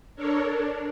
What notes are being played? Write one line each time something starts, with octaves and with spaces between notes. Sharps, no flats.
D4 A4 A#4 C#5
D4